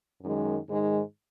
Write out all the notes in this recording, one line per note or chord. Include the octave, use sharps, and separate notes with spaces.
F#2 D#3 G#3
G#2 D#3 G#3